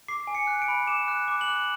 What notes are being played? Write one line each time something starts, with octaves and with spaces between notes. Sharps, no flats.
D6 C7
G#5
C#7
F#6
D7
B5
D6 E7
F#6
D6
F#7
F#6